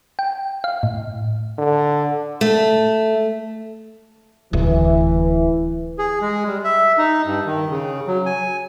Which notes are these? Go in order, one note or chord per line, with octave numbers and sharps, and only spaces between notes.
G5
F5
A2
D3
A3
D1 E3
G#4
G#3
G3
E5
D#4
G2
D#3
C#3
F#3
G#5